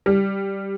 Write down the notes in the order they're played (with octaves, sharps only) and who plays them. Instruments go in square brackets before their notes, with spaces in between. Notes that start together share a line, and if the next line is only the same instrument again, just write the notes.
[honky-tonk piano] G3